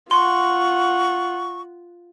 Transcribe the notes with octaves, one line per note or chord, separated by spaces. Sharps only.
F4 F#5 C6 C#6